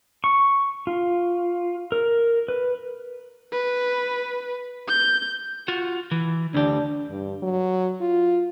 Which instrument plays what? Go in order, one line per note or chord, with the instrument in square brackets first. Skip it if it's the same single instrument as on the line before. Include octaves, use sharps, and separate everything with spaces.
[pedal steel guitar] C#6
F4
A#4
B4
[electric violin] B4
G6
[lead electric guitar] F4 F#4
E3
[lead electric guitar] D2 G4 [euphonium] D4
[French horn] G2
F#3
F4